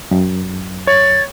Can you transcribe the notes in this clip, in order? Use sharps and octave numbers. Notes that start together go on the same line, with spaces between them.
F#2
C#5 A6